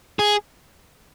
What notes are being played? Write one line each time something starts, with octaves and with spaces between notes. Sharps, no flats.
G#4